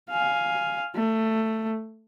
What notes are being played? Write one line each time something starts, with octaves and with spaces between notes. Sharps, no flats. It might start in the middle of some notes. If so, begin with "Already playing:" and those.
F5 G#5
A3